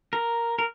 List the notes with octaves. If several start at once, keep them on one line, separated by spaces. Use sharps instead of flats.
A#4
A#4